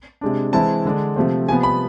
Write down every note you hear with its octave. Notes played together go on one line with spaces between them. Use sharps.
C3 G#3 D4
E3 G#3 C4 E4 A5
D3 G#3 D4
C3 F3 A3 C4
C3 F3 B3 G#5
B5